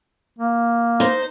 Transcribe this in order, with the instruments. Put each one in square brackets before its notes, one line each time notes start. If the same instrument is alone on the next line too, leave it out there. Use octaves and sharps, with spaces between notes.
[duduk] A#3
[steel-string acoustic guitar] D#4 C5